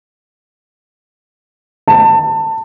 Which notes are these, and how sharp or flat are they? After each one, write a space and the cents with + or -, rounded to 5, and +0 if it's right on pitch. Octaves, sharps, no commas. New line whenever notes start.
A5 +25